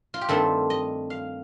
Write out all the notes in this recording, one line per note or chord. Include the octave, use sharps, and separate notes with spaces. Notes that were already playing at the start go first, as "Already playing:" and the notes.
F4
G4
G2 D#3 A3 C4 A4
D#5
F5